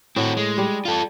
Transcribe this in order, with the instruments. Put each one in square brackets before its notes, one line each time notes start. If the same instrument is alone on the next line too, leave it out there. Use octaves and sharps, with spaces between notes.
[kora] A2 [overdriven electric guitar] C4 F#4
[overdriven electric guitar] G#3
[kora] G3
[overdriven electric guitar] F4 A4